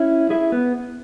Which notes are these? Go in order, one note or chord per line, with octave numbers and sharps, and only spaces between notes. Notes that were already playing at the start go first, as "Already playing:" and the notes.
Already playing: C#4 E4
E4 G#4
B3